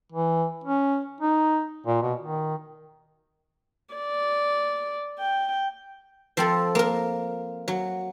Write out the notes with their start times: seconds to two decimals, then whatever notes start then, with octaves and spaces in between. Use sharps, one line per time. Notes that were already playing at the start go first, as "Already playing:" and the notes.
0.12 E3
0.64 C#4
1.21 D#4
1.86 A#2
2.02 B2
2.21 D#3
3.95 D5
5.20 G5
6.37 F3 C4 A4
6.75 A#3 A#4
7.68 F#3